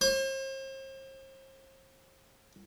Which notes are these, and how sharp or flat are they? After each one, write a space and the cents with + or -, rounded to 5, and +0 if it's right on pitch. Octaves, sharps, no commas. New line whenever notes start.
C5 +40